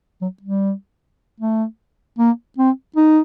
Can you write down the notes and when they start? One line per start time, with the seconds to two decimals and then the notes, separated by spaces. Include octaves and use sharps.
0.22 F#3
0.42 G3
1.40 A3
2.19 A#3
2.58 C4
2.96 D#4